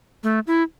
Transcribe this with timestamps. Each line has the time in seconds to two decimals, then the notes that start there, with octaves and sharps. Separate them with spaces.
0.23 A3
0.47 E4